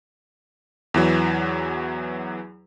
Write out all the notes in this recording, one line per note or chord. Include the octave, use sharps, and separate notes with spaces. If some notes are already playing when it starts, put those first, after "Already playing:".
E2 E3 F#3